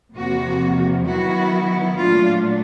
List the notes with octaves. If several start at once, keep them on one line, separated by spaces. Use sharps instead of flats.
E2 C3 F3 A#3 F#4
D#3 F#3 B3 E4 F#4
A#2 F#3 A3 D4 F4